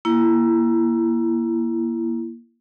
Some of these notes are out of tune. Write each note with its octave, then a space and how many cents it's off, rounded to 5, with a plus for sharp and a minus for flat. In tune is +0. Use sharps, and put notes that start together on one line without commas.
A#3 +20 E4 +20